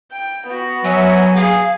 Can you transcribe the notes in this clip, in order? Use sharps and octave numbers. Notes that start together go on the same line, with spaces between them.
G5
B3 F#4
F#3 E5 G#5
G#4 F5